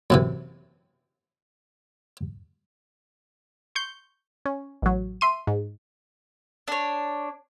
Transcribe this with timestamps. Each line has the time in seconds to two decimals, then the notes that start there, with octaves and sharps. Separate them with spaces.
0.10 F#2 C3 E3
3.75 C6 C#6 G6
4.46 C#4
4.82 A1 F#3
5.21 E5 C6 D#7
5.47 G#2
6.68 D4 C#5